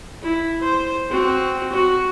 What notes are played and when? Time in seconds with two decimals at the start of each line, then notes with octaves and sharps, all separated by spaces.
0.22 E4
0.63 C5
1.11 C4 F#4
1.73 F#4